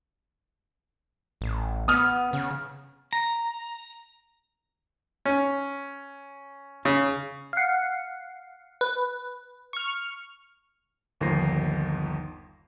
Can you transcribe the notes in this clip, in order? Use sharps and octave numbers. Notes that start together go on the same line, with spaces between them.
A1
B3 D#6 F6
C#3
A#5
C#4
C#3
F5 F#5
B4
C#6 F6
G1 D#2 D#3 F3 A#6 C7